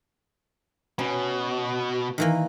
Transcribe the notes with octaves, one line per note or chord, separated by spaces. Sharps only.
B2 C#4
D#3 E3 A#3